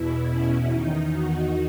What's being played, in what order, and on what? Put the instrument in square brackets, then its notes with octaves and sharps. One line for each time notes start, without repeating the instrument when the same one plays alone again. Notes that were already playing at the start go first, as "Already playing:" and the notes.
Already playing: [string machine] E2 B2 E4
C#4
E2 D#3 D#4
F#4